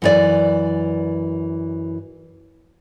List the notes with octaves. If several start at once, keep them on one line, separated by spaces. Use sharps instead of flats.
F#2 E3 D5